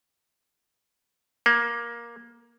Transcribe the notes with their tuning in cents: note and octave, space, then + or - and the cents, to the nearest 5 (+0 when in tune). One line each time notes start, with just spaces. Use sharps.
A#3 +15